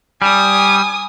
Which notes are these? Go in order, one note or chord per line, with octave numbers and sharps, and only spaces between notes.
G3 G#5 D#6